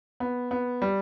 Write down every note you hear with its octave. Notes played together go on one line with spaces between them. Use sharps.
B3
B3
G3